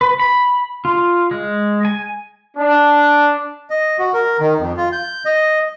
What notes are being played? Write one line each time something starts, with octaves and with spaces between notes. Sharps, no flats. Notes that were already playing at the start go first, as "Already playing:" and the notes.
B4
B5
F4
G#3
G#5
D4
D#5
F#4
A#4
D#3
F2
F4
G6
D#5